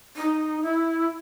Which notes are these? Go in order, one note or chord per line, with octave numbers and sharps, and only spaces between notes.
D#4
E4